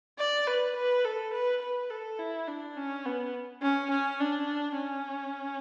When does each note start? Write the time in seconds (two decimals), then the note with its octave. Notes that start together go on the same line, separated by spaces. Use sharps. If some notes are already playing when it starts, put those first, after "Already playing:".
0.19 D5
0.47 B4
0.76 B4
1.05 A4
1.34 B4
1.62 B4
1.90 A4
2.19 E4
2.48 D4
2.76 C#4
3.05 B3
3.62 C#4
3.91 C#4
4.20 D4
4.77 C#4